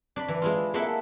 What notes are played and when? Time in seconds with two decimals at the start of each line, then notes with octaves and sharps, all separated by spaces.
0.16 D4 D5 B5
0.28 E3
0.42 G#3 E4 F4
0.74 G#3 A#3 E4 A4 E5 F#5